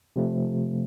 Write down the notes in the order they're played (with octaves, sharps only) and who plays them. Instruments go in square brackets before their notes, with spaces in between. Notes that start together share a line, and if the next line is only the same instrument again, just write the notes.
[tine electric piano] C3 F3 A3